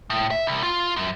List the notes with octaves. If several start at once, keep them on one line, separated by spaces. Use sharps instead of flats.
A2
E5
C2
F4
F#2